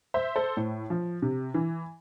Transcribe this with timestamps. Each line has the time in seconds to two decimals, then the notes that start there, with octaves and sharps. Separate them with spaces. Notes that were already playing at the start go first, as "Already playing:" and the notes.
0.14 C5 E5
0.36 A4 C5
0.57 A2
0.90 F3
1.22 C3
1.54 E3